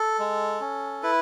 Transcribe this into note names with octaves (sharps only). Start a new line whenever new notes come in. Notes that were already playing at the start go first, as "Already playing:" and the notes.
Already playing: A4
G#3
C#4
E4 B4